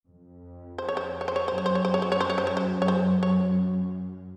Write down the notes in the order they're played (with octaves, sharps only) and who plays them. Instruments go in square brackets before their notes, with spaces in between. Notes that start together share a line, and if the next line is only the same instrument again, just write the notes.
[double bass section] F2
[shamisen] C5
C#5
C5
C#5
C5
C#5
[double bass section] F#2 [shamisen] C5
[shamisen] C#5
C5
C#5
C5
C#5
C5
C#5
C5
C#5
C5
C#5
C5
C#5
C5
C#5